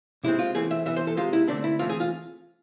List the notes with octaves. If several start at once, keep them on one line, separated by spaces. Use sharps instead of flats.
C3 G#3 C4 E4
F4
E3 A3 C4 G#4
E5
E3 B3 E5
C5
A4
C3 G#3 C4 F4
E4
D3 A3 C4 D4
E4
E3 A3 C4 F4
G#4
F4